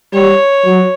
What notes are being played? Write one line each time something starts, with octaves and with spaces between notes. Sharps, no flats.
G3 C#5
F#3